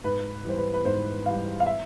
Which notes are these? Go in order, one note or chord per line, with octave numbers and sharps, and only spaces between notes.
G#2 B4
E3 G3 C5
B4
B4
G#2 C5
E3 G3 F5
F5
E5